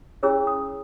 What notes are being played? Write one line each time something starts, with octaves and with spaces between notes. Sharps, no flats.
C#4 E4 G#4 C#5 E6
D#6